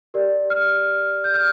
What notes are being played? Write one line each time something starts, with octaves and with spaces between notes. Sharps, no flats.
G4 A#4 D5
F6
G6
F6